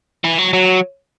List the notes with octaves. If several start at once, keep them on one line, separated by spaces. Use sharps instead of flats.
E3
F#3
F#3